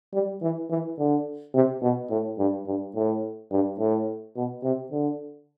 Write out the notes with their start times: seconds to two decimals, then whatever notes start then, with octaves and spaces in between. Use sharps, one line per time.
0.13 G3
0.42 E3
0.70 E3
0.98 D3
1.54 C3
1.82 B2
2.10 A2
2.38 G2
2.67 G2
2.95 A2
3.51 G2
3.79 A2
4.36 B2
4.63 C3
4.91 D3